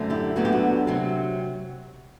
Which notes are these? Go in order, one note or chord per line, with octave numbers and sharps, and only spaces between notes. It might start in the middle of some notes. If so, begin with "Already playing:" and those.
Already playing: F#2 D3 A3 C4
E4 G4
D2 D3 F#3 B3 D4 F#4
G4
F#4
C3 F#3 C4